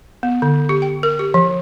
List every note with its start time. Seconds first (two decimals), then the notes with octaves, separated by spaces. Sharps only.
0.23 B3
0.42 D3
0.69 G4
0.82 G5
1.03 A#4
1.19 G4
1.34 F3